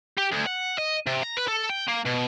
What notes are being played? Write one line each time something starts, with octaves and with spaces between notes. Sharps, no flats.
G4
D2
F#5
D#5
C3
A#5
B4
A4
G5
A#3
B2